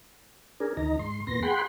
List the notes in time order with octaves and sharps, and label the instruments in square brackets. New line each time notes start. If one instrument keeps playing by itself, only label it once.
[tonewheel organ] D4 G#4 A#4
D2 D#3 D#4 A#5
G#2 C6
E2 A#2 B3 C6 A#6
G#4 F#5 G5 B5 C6